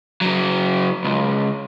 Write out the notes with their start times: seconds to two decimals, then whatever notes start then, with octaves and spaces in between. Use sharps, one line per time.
0.21 C#3 F#3
1.04 C#2